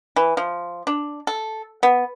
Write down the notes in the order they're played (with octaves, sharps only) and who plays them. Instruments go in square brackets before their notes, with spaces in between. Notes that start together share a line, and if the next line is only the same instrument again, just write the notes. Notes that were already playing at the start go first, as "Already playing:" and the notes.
[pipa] E3
F3
D4
A4
B3